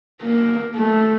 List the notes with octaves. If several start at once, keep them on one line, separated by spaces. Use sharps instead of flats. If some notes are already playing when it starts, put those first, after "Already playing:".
A#3
A3